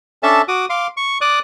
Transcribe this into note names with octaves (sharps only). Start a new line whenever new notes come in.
C#4 D4 A4 E5 A5
F#4 D6 D#6
F5 C6 D6
C#6
D5 D6 D#6 F#6